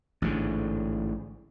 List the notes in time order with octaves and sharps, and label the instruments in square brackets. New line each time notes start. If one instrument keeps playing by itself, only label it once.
[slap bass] A1 G#2 D3